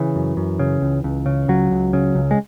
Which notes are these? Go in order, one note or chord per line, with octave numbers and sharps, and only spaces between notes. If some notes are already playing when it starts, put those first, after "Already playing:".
Already playing: C#3 E3
F#2
F#2
C#3
C#2
C#2
C#3
C#2 F#3
C#2
C#3
C#2
G#3